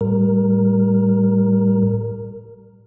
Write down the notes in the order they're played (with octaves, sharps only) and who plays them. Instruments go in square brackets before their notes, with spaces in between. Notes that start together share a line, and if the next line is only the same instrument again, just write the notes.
[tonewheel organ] A2 G3 A#4